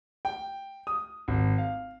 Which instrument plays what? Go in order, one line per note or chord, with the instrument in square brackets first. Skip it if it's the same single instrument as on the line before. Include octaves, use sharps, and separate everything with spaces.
[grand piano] G5
D#6
G#1
F5